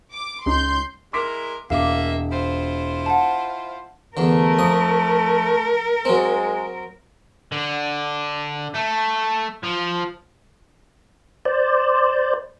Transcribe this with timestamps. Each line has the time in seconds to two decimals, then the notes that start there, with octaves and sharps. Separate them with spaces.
0.14 D6
0.46 C#2 C#4 D#4 C6 G6
1.13 G#3 E4 A#4 C6 D6 B6
1.70 E1 A#3 E5 F5 D6
2.31 E4 F4 C5
3.06 F#5 A5
4.17 E2 D3 A3 A#4
4.59 F2 D#6
6.05 F#3 G#3 C4
7.52 D3
8.75 A3
9.64 F3
11.45 C5 D5